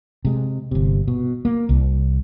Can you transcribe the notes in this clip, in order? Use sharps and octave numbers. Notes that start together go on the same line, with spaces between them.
C3 G#3
G1 C3
B2
A#3
C2